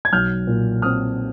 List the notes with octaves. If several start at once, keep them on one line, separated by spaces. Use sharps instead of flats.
G#6
B1 F6 G6
A#2
C4 D#6 F6